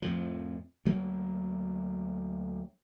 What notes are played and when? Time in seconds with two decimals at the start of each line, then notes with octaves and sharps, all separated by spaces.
0.02 F2 A2 F3
0.85 D2 F#3 A#3